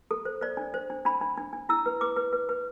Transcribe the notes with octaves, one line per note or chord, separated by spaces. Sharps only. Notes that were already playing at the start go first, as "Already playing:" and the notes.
A4
C5
C5 D5
D4
C5
D4
D4 B5
D4
D4
D4
E4 E6
B4
B4 D6
B4
B4
B4